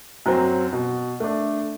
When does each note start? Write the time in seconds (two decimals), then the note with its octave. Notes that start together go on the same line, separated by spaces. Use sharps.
0.26 F#2 F#3 C4
0.73 B2
1.20 A3 D4